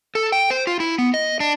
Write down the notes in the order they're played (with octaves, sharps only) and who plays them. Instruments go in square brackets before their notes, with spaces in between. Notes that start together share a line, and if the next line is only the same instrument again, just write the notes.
[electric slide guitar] A4
G5
C5
F4
E4
B3
D#5
D4